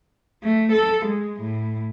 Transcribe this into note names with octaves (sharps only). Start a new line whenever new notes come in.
A3
A4
G#3
A2